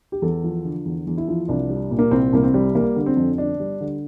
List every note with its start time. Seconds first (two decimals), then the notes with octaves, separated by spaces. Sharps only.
0.12 G4
0.22 E2 A4
0.44 F3
0.65 D3
0.85 E2
1.07 E2
1.18 E4
1.28 F3
1.48 C2 D4
1.70 G3
1.91 A#2
1.99 A#3
2.11 C2 C4
2.33 C2 A#3
2.43 C4
2.54 G3
2.75 G3 A#3
2.96 D3
3.06 C4
3.17 F2
3.38 G1 D4
3.60 G3
3.81 D3